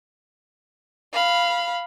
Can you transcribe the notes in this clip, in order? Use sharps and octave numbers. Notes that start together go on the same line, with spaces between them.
F5 B5